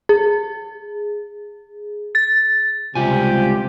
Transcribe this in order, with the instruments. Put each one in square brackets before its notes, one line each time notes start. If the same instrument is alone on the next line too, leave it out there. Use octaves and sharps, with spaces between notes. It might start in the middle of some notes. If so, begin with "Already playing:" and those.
[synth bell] G#4
A6
[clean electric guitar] C#2 G3 G#5 [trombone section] C3 [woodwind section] F3 G4 [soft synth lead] F4